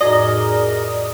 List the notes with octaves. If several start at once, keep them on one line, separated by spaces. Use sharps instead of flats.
F2 A2 D#4 F#4 G#4 A#4 D5 D#5